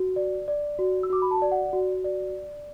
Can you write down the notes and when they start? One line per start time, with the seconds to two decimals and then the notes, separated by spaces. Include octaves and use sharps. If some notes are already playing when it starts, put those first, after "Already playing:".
Already playing: F#4
0.16 D5
0.48 D5
0.79 F#4
1.03 E6
1.10 F#4 D6
1.22 B5
1.31 A5
1.42 D5
1.52 F#5
1.73 F#4
2.04 D5